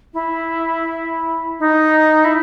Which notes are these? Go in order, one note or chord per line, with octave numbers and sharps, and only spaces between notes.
E4
D#4
E4